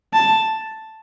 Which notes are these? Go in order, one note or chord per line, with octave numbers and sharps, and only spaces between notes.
A5